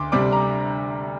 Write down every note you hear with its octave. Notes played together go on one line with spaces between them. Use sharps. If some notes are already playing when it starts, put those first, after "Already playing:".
Already playing: D2 C6 D6
C3 G3 D4 D6
A#5